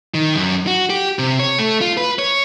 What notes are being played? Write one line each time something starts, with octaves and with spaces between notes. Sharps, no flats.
D#3
F#2
F#4
G4
C3
C#5
A3
F4
B4
C#5